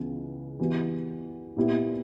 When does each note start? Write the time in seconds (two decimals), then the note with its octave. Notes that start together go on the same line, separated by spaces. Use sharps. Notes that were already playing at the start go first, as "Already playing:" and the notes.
Already playing: C#2 C#3 E3 B3
0.59 E3 G3 B3 F#4
1.57 A#2 G3 B3 E4 G4